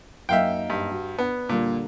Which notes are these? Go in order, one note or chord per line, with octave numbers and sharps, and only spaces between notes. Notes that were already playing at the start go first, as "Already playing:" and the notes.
F#2 A#3 D#4 E5 F5 G5
G2
F#4
B3 D4
A#2 D3 G3 A#3